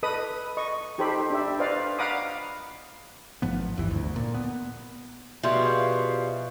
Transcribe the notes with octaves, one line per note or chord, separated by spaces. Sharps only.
A4 B4 D#5 B5 D#6
D#5 C#6
D#4 G4 A4 C5 B5
D4 G4 E5
B4 C5 D5 D#5 F5
F5 F#5 A#5 B5 D6 D#6
G#1 G#2 F3 B3
G1 D#2 E3
D2
A#2
B3
B2 F3 G3 G#4 E5 C6